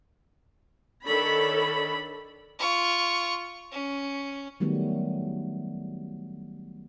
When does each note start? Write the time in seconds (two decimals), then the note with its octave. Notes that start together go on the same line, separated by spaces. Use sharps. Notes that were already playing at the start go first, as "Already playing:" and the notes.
1.07 D#3 D4 A4 C#5 B5
2.59 F4 C#6
3.72 C#4
4.60 D#3 F#3 G3 A3 B3